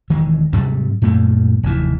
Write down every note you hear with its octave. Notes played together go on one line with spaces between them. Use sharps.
E1 D#3 E3 G#3
G#2 C3 F#3 G3
F#2 A#2 A3 A#3
F1 D#2 E3